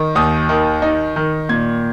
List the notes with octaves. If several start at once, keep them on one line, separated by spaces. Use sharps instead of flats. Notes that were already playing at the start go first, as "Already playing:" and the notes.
Already playing: D#3
D#2 D#6
D#3
D#4
D#3
A#2 G#6